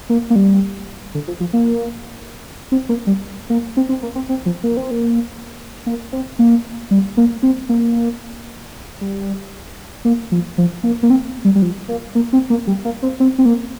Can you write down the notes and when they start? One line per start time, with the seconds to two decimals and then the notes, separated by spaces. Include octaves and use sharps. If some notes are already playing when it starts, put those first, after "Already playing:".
0.10 A#3
0.30 A#3
0.36 G3
1.15 D3
1.28 F3
1.40 F3
1.53 A#3
2.72 C4
2.89 A#3
3.07 G3
3.50 A#3
3.77 C4
3.89 C4
4.03 A#3
4.15 C4
4.29 C4
4.46 F3
4.63 A#3
4.77 C4
4.91 A#3
5.86 A#3
6.13 C4
6.39 A#3
6.91 G3
7.17 A#3
7.43 C4
7.69 A#3
9.01 G3
10.05 A#3
10.32 F3
10.58 F3
10.84 A#3
11.03 A#3
11.10 C4
11.45 G3
11.55 G3
11.62 F3
11.88 A#3
12.15 A#3
12.33 C4
12.50 A#3
12.67 G3
12.85 A#3
13.02 C4
13.20 C4
13.38 C4
13.45 A#3